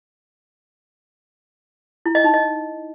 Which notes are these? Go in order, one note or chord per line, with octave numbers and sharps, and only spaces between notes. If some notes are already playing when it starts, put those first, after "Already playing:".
E4
D#5
D#4
D#5